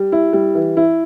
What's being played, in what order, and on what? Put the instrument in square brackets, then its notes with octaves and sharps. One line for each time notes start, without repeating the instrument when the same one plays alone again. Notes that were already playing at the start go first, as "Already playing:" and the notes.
Already playing: [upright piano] G3
E4
G3
E3
E4